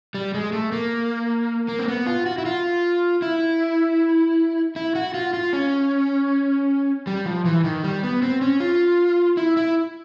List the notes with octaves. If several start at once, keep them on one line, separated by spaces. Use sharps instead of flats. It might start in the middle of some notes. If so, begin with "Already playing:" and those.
G3
G#3
A3
A#3
A#3
C4
B3
F4
F#4
E4
F4
E4
E4
F#4
F4
F4
C#4
G3
F3
E3
D#3
G3
B3
C4
C#4
F4
E4
E4